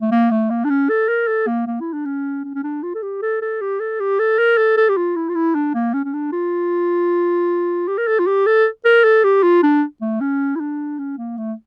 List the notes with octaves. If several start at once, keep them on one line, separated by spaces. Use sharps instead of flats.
A3
A#3
A3
A#3
D4
C#4
A4
A#4
A4
A#3
A#3
E4
D4
C#4
C#4
C#4
D4
F4
A4
G4
A4
A4
G4
A4
G4
A4
A#4
A4
A4
G4
F4
E4
F4
E4
D4
A#3
C#4
C#4
D4
F4
G4
A#4
A4
F4
G4
A4
A#4
A4
G4
F4
D4
A3
C#4
E4
D4
C#4
A#3
A3